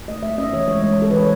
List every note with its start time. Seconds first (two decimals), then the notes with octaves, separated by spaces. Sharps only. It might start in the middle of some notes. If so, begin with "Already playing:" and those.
0.08 A3 D#5
0.23 A3 E5
0.38 C#4 D#5
0.53 E3 C#5
0.68 G#3 C#5
0.83 G#3
0.98 G#3 A4
1.11 E3 B4
1.20 C#5